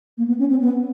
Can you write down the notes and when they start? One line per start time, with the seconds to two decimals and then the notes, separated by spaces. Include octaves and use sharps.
0.18 A#3
0.28 B3
0.39 C#4
0.50 C4
0.62 B3